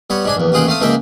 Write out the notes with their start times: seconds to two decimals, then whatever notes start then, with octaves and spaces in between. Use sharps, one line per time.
0.10 G3 B3 C#5
0.25 G#2 D4 G#5
0.37 A#1 E2
0.52 A1 D#2 F4 G#4 F#5 G5
0.67 A3 C4 F5 D#6
0.81 C#2 F3 G#3 A#3 E5 G5